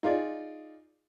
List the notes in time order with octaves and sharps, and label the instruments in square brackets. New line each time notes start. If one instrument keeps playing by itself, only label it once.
[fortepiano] D#4 F4 G#4 D5